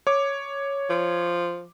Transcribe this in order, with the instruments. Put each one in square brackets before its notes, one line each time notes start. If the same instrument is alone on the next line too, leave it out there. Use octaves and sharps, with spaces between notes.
[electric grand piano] C#5 D6
[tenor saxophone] F3